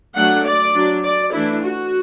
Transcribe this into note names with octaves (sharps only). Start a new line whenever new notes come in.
F#3 A3 D4 F#5
D5
F#3 D4
D5
E3 A3 D4 E4
F#4